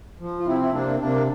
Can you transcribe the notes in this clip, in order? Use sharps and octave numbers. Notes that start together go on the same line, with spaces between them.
F3
F4
C3 C4 E4
E4
C3 A#3 D4
C4
C3 A#3 D4